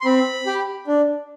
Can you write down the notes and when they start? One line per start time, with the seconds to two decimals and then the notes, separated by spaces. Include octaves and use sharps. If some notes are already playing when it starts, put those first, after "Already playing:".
0.01 C6
0.05 C4 B5
0.46 G4
0.87 D4